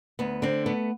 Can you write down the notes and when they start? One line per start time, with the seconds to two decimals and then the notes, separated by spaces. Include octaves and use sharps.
0.19 D2 B3
0.42 D3 C4
0.66 A3 B3